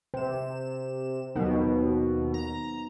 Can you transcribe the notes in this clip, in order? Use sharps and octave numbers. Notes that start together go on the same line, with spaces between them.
C3 C5 E7
D#2 B2 F#3 B3 D#4
A#5